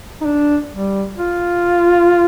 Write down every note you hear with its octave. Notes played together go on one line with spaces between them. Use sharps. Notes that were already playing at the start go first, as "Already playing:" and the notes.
D#4
D4
G3
F4